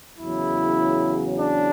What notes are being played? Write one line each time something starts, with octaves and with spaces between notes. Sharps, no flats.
E2 C#3 F#3 E4
D4